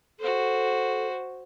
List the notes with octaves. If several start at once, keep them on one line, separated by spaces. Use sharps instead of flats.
F#4 A4 C5